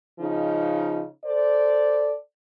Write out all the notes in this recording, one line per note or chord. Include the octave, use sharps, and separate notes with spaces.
C#3 F3 D#4
A4 C5 D5